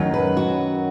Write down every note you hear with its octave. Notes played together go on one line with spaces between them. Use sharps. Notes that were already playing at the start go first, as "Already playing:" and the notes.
Already playing: F#2 D#3 F#3
B4
F#4